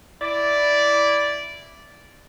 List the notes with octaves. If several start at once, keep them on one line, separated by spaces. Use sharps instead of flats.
E4 D5